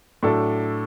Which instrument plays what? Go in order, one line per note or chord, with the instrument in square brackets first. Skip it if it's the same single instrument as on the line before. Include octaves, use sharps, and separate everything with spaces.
[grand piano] A2 F#3 A3 D4 A4